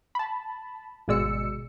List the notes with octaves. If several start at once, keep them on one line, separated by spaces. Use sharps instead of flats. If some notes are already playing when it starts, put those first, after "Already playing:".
A5 B5
G#1 B2 G#3 D5 E6 C#7